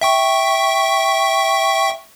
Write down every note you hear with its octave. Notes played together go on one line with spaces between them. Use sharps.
E5 G5 C#6